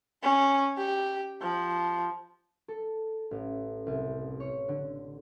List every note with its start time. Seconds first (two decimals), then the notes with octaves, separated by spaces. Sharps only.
0.23 C#4
0.77 G4
1.42 F3
2.68 A4
3.31 A1
3.87 C2
4.40 C#5
4.68 D3